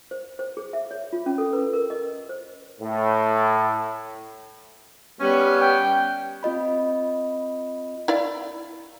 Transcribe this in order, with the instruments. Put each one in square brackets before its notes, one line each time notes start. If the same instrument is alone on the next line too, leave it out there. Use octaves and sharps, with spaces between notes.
[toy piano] C5
C5
G#4
E5
C#5
F4
C#4
A4
B4
A#4
D#5
C5
[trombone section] A2
[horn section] G3 B3 C#4
[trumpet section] G5
[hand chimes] C4 F4 D#5 B5
[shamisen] E4 D5 F5